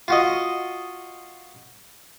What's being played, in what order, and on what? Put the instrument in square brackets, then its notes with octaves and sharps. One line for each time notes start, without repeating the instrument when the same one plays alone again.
[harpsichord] F4 F#4 D#5